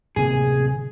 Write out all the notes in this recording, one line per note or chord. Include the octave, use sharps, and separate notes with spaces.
D1 C3 A#3 G#4